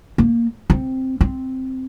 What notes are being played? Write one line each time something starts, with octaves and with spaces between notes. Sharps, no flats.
A#3
C4
C4